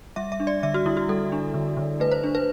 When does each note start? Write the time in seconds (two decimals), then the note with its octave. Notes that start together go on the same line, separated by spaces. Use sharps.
0.16 G3 E5
0.32 E5
0.40 D4
0.47 D5
0.63 D3 E5
0.74 F#4
0.86 D3 E4
0.97 F#4
1.09 G3 A4
1.32 D4
1.54 D3
1.77 D3
2.00 A3 B4
2.11 C5
2.24 D4
2.35 B4